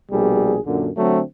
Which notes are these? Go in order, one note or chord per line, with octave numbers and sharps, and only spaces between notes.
A#1 B2 G3 G#4
F#2 A#2 D3
D3 F#3 A3 C4